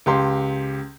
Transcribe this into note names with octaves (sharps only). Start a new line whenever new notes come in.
C#2 G4 C6